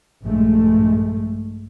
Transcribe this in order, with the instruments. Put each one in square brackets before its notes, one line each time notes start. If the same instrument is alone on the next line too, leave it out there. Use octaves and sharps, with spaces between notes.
[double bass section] A#1 G2 G#3 A3